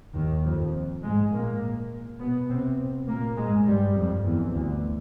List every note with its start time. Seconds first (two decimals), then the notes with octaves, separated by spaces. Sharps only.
0.14 D#2 D#3
0.44 F2 F3
1.03 G#2 G#3
1.32 A#2 A#3
2.19 B2 B3
2.49 C3 C4
3.07 A#2 A#3
3.37 G#2 G#3
3.66 G2 G3
3.95 F2 F3
4.24 E2 E3
4.53 D2 D3